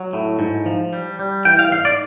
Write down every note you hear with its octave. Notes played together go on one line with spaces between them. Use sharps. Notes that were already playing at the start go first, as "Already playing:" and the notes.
Already playing: F#3
A2
G#2
F3
G3
G3
E3 G5
F5
G#2 F5
D5